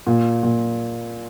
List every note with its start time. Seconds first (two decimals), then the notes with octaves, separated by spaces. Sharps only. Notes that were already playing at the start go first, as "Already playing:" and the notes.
0.07 A#2
0.43 A#2